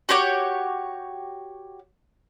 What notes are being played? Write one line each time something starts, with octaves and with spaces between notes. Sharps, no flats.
F#4 G4 C#5 D6